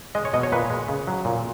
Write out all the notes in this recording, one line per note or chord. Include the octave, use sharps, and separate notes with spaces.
G#3 D#5
C#5
B2 D#5
C#5
A#2 B4
G#3
C#3
F#3
A#2